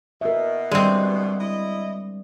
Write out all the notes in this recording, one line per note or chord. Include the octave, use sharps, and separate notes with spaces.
B2 A#4 E5
G3 G#3 C4 D4 D5
E4 D#5